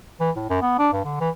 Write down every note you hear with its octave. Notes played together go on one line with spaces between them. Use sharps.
E3
A2
F#2
B3
D4
G2
D3
E3